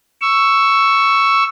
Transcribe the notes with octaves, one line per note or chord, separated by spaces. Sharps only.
C#6 E6